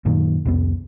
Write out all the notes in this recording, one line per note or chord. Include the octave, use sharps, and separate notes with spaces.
F#2 A#2 D#3
C2 F2 B3